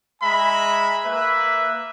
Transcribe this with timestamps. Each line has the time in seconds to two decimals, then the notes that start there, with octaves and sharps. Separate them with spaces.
0.22 G#3 E5 G#5 A#5 B5
1.05 A#3 B4 E5